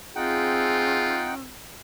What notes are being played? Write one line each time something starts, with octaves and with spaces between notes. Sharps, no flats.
C4 D#4 F4 G#4 F#5 G5